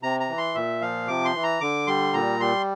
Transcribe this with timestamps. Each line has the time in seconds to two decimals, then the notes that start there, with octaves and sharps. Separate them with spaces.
0.02 C3 A#5
0.20 A#5
0.29 E3
0.38 C6
0.55 A#2 E5
0.81 F3 F5
1.08 C3 D6
1.25 C6
1.35 E3
1.43 A#5
1.61 D3 D6
1.87 G3 C6
2.13 A#2 A#5
2.40 G3 C6